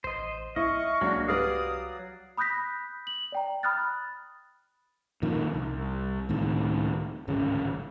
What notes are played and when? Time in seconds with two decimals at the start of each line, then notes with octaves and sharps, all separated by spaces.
0.04 A1 C5 D#5
0.56 A#1 E4 D#5 F5 C#6
1.01 C2 F#3 G#3 A#3 D4 F#4
1.29 F#3 G4 B4 D5 F5 D#6
2.37 B5 D#6 F#6 G6 A#6 B6
3.07 F#7
3.32 D5 G5 A#5
3.63 B5 D#6 F6 F#6 A6
5.22 F2 A#2 D#3
5.54 C2
6.29 C#2 A2 D#3 C4
7.28 D1 G#1 C#3 C#4